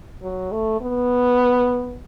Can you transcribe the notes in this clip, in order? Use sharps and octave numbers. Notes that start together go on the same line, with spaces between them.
F#3
A3
B3